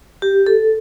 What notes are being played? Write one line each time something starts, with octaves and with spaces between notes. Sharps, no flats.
G4
A4